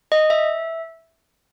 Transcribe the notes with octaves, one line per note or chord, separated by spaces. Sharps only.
D#5
E5